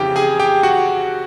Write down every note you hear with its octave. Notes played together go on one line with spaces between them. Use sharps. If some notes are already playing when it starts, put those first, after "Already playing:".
Already playing: F2 C#3 E3 G4 G5
G#4 G#5
G4 G5
F#4 F#5